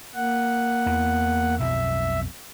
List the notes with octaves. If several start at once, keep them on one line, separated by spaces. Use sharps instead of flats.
A#3 F#5
E2 E3
B1 F2 B2 E5